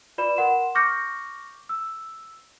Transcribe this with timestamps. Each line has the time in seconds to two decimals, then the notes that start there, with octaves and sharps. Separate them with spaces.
0.18 F4 B4 D5 B5 E7
0.36 A#4 F#5 C6 E7
0.75 C#6 D6 F6 G6 A#6 C#7
1.69 E6